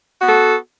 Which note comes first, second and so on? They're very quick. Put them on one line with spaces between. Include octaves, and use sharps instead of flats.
F#4 B3 A4